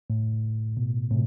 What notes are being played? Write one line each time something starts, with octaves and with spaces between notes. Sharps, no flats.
A2
B2
A2 C3